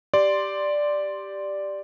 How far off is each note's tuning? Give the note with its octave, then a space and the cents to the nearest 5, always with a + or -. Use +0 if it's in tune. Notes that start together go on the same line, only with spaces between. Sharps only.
G4 +0 D5 +0 C6 +0